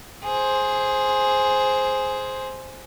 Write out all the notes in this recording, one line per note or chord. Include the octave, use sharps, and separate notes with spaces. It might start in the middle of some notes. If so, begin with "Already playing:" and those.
G#4 C5